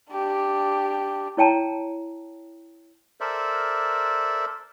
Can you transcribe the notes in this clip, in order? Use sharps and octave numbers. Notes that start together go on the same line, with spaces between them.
D4 G4
E4 C#5 G5 A5 A#5
A4 A#4 C5 D5 E5